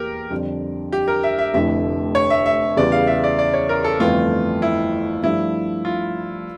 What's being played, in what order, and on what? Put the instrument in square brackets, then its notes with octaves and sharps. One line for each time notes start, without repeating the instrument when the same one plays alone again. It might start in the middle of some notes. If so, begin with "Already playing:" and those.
Already playing: [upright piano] E2 E3 A#3 [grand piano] G4 A#4
[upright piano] F2 D3 G3 D4
[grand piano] G4
A#4
E5
E5
[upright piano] F1 F2 D3 A3 E4 [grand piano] E5
[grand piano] C#5
E5
E5
[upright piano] E2 C#3 E3 G3 [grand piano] D5
[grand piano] F5
E5
D5
D5
C#5
A#4
A4
[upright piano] G1 F2 E3 A3 [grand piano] F4
[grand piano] E4
[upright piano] G2 F3 A3 [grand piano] E4
[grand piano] F4